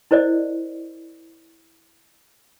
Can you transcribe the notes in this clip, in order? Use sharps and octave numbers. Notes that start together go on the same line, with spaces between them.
E4 A#4 C5 D5 D#5